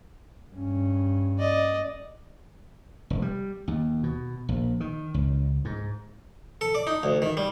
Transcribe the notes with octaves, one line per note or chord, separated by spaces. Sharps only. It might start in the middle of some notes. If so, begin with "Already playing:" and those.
G2 C#4
D5 D#5
F1
G3
D#2
B2
A#1
D#3
C#2
G#2
A4
D5
D#4
D2
D#3
G3